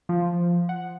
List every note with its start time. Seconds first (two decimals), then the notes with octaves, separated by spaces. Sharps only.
0.09 F3
0.69 F#5